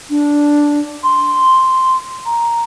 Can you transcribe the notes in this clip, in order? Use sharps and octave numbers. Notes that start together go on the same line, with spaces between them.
D4
C6
A#5